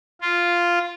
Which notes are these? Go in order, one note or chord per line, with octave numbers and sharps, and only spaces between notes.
F4